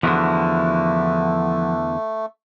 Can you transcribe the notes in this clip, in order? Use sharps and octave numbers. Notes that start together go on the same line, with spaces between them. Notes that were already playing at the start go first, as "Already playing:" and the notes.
E2 D3 F3 A3 E4 F#4